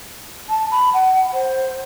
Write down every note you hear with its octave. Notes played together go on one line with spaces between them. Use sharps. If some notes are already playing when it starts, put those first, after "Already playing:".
A5
B5
F#5
C5